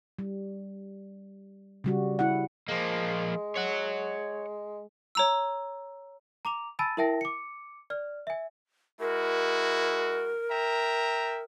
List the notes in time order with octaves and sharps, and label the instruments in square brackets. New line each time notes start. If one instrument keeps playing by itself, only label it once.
[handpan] G3
C#3 G3 F#4
E4 F#5
[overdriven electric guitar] F3 A#3 [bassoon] G#3
[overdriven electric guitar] C#5 F#5
[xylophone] C#5 A#5 E6
[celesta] A#5 D6 F7
G#5 A5 B5 E6 A6 D#7
E4 A#4 E5 G5 A5 A#6
D6 C#7
D5 F6
E5 G#5
[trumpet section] G#3 E4 F#4 [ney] A#4
[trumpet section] E5 G5 A#5